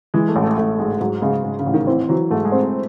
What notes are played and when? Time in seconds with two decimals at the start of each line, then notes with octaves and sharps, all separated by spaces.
0.14 E3 G#3
0.28 A3
0.36 A1
0.43 A3
0.57 A1 A3
0.79 G#2 G#3
1.01 G#2 F#3
1.22 C#3 G#3
1.44 G#2
1.59 C#3
1.66 A1
1.74 D#3
1.87 E3 C4
2.09 E3 F#3
2.31 G#2 A3
2.45 G#3
2.52 C4